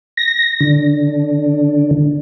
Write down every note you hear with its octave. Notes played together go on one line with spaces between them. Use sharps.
A#6
D3